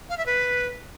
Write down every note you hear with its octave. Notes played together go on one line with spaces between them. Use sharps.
F5
E5
B4